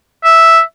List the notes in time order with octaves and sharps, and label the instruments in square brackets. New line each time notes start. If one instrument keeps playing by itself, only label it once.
[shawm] E5